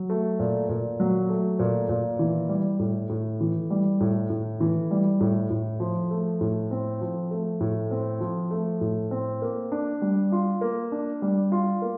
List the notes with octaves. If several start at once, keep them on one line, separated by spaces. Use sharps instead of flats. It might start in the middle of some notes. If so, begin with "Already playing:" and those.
Already playing: F#3
A3
A#2
A#2
F#3
A3
A#2
A#2
E3
G3
A2
A2
E3
G3
A2
A2
E3
G3
A2
A2
F3
A3
A2
C4
F3
A3
A2
C4
F3
A3
A2
C4
A#3
D4
G3
F4
A#3
D4
G3
F4
A#3